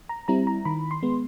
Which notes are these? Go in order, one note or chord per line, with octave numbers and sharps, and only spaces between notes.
A#5
G3 C4 E4 A#5
A#5
D#3 B5
C6
G#3 B3